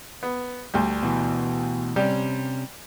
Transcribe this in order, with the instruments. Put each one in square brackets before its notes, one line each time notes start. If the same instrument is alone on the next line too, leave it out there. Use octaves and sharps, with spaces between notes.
[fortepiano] B3
D2 G3
[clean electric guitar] B2 E3
[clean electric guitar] C3 C#4 [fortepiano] G3